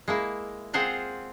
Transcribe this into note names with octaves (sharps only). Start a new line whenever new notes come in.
G#3 A#3 E4
C4 F4 G#4 C5 F#5 A#5